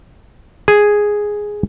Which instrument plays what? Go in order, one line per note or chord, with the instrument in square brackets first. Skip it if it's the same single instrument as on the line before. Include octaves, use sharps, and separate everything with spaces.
[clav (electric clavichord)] G#4